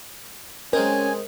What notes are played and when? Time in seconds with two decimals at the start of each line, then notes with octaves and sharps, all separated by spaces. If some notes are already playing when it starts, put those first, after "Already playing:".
0.73 G#3 C4 C#4 D#4 A#4 G#5